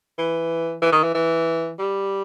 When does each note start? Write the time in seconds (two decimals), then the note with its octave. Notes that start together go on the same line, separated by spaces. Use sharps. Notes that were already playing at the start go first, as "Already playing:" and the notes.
0.18 E3
0.82 E3
0.92 D#3
1.03 E3
1.15 E3
1.79 G3